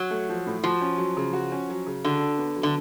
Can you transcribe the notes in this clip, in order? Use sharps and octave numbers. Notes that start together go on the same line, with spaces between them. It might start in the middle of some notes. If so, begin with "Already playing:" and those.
Already playing: F#3
A3
F3
A2
F3 F#4
C#4
F#3
C#3
F#4
C#4
F#3
C#3
D3 F#4
D4
B3
F#3
D3